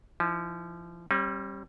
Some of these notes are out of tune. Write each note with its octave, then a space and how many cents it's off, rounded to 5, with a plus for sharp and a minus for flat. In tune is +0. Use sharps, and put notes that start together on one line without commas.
F3 -30 E4 -45
G3 +0 C#4 -45